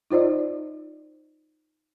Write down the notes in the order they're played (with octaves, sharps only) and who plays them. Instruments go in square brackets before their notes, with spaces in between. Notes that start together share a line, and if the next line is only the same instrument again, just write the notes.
[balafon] D#4 F4 C5 D5 D#5